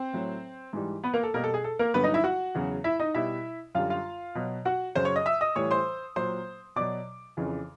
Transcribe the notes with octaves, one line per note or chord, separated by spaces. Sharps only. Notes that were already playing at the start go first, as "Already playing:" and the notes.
Already playing: C4 C5
A2 F#3
G#2 E3 G3
B3 B4
A#3 A#4
A4
B2 G3 A#3 A#4
A4
G#4
A4
A#3 A#4
G2 D3 F#3 B3 B4
D#4 D#5
E4 E5
F#4 F#5
E2 C#3 F#3
E4 E5
D#4 D#5
B2 G3 E4 E5
F#2 D3 G3 F4 F5
F4 F5
B2 F#3
F#4 F#5
F#2 C#3 F#3 C5 C6
C#5 C#6
D#5 D#6
E5 E6
D#5 D#6
A2 E3 G3 C#5 C#6
C5 C6
A#2 F#3 C5 C6
B2 F#3 D5 D6
F2 C#3 E3